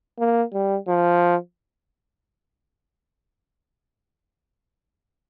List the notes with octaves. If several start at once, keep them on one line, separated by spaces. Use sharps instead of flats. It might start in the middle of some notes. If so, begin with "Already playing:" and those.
A#3
G3
F3